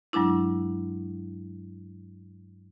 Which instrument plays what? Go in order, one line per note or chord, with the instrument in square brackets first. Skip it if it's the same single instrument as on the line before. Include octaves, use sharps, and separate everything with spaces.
[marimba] G2 F#3 G#3 D4 E4